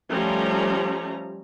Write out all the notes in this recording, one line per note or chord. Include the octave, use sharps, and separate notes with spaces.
F3 G3 A3 C#4 A#5